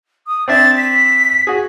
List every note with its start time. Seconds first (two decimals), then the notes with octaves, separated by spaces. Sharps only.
0.27 D#6
0.48 C4 D4 E5 A6
0.77 B6
1.47 F#4 G#4